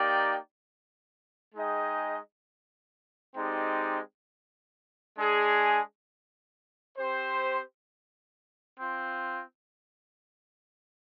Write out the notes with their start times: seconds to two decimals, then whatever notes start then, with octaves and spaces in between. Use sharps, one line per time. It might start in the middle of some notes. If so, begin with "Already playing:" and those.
Already playing: A#3 D#4 G4 D5 G5
1.54 G#3 D#4 G#4 D#5 G5
3.36 G#3 C4 D#4 G4 D5
5.17 G#3 D4 G#4
6.97 C4 G4 C5
8.79 C4 F4